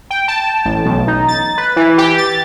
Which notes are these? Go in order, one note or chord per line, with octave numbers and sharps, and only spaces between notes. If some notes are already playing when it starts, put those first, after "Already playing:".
G5
A5
A1
B1
D#4
A6
B4
E3
G4
A6